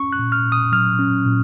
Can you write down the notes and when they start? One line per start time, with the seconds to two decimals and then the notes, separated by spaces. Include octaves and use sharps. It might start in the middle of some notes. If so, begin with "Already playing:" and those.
Already playing: C#4 C#6
0.13 F#6
0.19 A#2
0.32 F6
0.45 A#2
0.52 D#6
0.72 F#3 F6
0.99 C#4
1.26 A#2